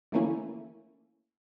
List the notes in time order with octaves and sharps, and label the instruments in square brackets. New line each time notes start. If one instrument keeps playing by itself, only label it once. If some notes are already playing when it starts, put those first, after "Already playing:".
[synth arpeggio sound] D3 E3 A3 A#3 C#4 E4